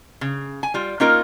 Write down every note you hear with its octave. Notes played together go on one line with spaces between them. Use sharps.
C#3
G#5
G3 F4
A#3 C#4 D#4 F4 A#4